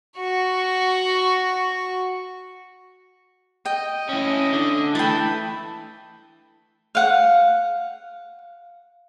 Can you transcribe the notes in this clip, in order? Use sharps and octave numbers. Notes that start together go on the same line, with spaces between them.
F#4 C#6
D#5 G5
C#4 E4
D3
E3 A3 E4 G5 A5 B5
F5 F#5